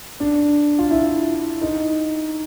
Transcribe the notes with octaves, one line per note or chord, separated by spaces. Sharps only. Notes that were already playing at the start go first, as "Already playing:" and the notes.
D4
F4
E4
D#4